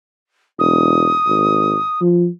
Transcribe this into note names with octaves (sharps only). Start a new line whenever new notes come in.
E1 D#6
G#1
F3